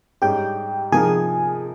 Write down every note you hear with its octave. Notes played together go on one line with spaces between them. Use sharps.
G#2 G3 C#4 G4 G#4 G5
C3 F3 A#3 D#4 G#4 A#4 G#5